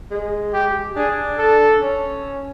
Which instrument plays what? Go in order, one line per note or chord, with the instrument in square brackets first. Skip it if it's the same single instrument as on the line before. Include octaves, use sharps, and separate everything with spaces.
[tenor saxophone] G#3
[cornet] G4
[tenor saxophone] D4 [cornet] G#4
[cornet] A4
[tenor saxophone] C#4